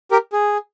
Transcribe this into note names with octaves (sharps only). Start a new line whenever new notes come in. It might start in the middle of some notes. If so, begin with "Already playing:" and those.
G4 A#4
G#4